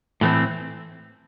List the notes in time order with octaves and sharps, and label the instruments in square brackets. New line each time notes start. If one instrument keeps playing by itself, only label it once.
[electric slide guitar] A2 E3 A3 C4